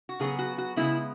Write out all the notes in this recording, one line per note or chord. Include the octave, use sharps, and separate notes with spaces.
F#4
C#3 F#3 B3 G#4
F#4
F#4
C#3 G#3 B3 E4